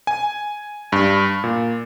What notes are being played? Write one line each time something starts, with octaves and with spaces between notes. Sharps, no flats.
G#5
G2
A#2